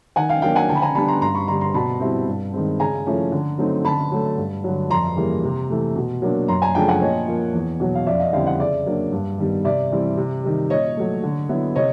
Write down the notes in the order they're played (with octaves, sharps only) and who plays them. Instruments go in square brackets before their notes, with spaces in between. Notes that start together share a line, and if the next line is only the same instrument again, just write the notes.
[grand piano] D#3 [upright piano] F#5 G#5
[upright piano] F5 G5
[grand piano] F#3 A#3 D4 [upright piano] F5 G5
[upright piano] F#5 G#5
[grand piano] D3 [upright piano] G5 A5
[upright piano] B5
G#5 A#5
[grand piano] G3 B3 D4 [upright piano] A5 B5
[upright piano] A#5 C6
[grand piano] G2 [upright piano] A#5 C6
[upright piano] B5 C#6
[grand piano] D3 G3 [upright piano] A#5 C6
[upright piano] A#5 C6
[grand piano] B2 [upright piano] A5 B5
[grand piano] G3 C4 E4
G2
D#3 G#3 C4
[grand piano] C#3 [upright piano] G#5 A#5
[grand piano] F3 A3 C#4 E4
D3
F#3 A3 C4 D#4
[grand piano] D3 [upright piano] A5 B5
[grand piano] F#3 A3
G2
D3 F#3
[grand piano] F2 [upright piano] A#5 C6
[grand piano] C#3 E3 G3 A#3
C3
E3 A3
B2
F#3 A#3 D4
[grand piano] F#2 [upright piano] A#5 C6
[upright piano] G#5 A#5
[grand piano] C#3 F3 A3 D4 [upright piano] G5 A5
[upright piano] F#5 G#5
[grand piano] A#2 [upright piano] C#5 D#5
[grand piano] F3 A#3
E2
B2 F#3
[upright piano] F5
[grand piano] F2 [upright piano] D5 E5
[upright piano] D#5 F5
[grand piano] D3 G3 C4 E4 [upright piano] F5 G5
[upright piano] E5 F#5
[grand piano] C#3 [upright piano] D5 E5
[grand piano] F#3 A#3 D4
G2
D#3 G3 B3
[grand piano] C3 [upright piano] D5 E5
[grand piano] E3 G3 C4 E4
C3
D#3 G3
[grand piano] A#2 [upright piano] C#5 D#5
[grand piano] F#3 A3
D3
F#3 B3 E4
[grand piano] C3 [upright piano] C#5 D#5